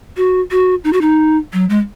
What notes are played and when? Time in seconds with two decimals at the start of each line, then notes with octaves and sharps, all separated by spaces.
0.17 F#4
0.51 F#4
0.84 D#4
0.93 F#4
1.01 D#4
1.53 F#3
1.70 G#3